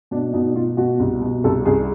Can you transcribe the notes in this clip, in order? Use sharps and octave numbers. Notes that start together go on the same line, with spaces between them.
B2 D4
B2 D#4
B2 F4
B2 F#4
C2
B2
C2 A4
C2 G#4